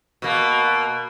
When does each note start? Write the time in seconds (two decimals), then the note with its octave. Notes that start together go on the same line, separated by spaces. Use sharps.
0.22 B2 A#3